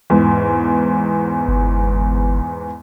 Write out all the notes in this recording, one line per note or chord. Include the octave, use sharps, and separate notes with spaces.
E2 G#2
G1